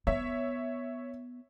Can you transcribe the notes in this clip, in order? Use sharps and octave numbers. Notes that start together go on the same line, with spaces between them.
B3 C#5 E5